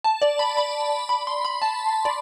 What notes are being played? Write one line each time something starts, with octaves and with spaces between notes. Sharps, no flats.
A5
D5
B5
B5
B5
C6
B5
A5
D5